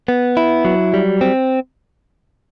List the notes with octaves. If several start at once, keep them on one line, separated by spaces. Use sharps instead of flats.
B3
E4
F#3
G3
C4